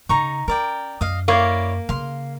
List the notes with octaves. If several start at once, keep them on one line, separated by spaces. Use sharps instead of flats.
C#3 D#4 A#5 C#6
C#4 A#4 D5 G5
F#2 D#5 F5
A#3 E4 C#5 D5
C#3 F5 C6